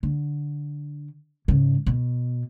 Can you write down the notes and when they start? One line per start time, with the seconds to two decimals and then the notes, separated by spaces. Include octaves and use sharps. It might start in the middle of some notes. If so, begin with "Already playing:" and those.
0.03 D3
1.48 G#2 C#3
1.86 B2